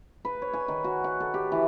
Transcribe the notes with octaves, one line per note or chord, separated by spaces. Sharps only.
B4
C#5
G#5
D#3
F#4
F#5
A4
G4
E3